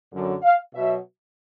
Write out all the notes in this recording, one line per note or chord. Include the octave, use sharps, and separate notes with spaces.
F#2 D3 F#3
F5
B2 F#3 E5